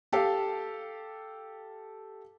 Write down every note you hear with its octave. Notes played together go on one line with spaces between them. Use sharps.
G4 A4 F5